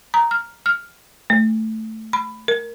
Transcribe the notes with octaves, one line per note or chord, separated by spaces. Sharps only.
A#5
F6
F6
A3
B5
A#4